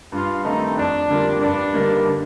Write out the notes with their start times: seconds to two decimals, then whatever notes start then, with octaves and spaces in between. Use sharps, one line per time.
0.12 G2 F4
0.44 D#3 A3 C4 D#4
0.76 F2 D4
1.08 D3 G3 A#3 F4
1.41 G2 D4
1.73 D3 G3 A#3 D#4
2.05 D3